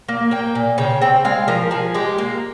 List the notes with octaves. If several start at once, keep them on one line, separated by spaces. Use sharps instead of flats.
A#3
A#3 G5
A#2
C#3 G5
C4 G5
G#3 F5
F3 A#4
F3 G#4
G#3 G4
A#3